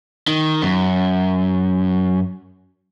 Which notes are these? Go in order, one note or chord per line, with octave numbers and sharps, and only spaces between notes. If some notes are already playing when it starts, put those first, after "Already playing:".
D#3
F#2